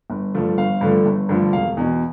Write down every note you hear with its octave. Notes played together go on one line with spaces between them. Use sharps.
G1
G2 D3 F3 A3
G1 F5
G2 D3 F3 A3
G1
G2 D3 F3 A3
E1 F5
E2 B2